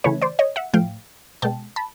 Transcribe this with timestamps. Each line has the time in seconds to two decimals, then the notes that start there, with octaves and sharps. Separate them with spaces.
0.04 C#3 E3 A3 B4 C#5
0.22 C5 D5
0.39 C#5 D#5
0.56 E5 F#5
0.73 A2 F3 A3 F5 G5
1.42 B2 G#3 G5 A5
1.76 A5 B5